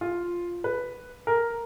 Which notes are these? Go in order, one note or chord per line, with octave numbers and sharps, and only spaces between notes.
F4
B4
A#4